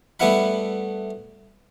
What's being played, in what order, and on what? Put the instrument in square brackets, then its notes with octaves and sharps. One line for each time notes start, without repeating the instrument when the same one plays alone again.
[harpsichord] G3 A3 B3 E4 F#5 B5